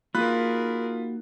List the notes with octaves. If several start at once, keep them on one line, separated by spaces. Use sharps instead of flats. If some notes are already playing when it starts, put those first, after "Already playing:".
A#3 D#4 F4 F#4 G#4 A#4 B5 F#6